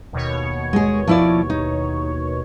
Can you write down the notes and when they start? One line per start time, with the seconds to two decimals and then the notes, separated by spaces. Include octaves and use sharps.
0.13 D#2 B2 C#5
0.73 G#3 G#4
1.07 F3 E4 D5
1.50 D#4